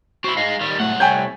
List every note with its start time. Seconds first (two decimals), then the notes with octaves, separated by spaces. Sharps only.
0.24 C4 E4 F#4
0.37 G#3 D#4 F5
0.61 D#3 G3
0.80 C2 A2 F#3 A3 F#5
1.00 A3 C#5 G5 G#5 G6